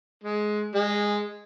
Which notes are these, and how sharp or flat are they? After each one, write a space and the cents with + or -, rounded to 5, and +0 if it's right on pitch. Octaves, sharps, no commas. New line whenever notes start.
G#3 +15
G#3 -10